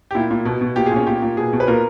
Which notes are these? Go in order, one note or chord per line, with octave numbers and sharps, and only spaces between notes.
G4
A#2 E4
A#2
B2
B2
A#2 G4
G#4
A#2 C#4
A#2 G4
A#2
B2 G#4
B2
B4
A#2 A#4